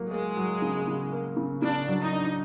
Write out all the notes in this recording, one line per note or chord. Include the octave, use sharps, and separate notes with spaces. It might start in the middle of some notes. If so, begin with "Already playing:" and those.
Already playing: F#3 A#3
G#3 A#3
F#3
C#3
C#3
A#3
C#3
C#3 D4
F#3
D#4
D4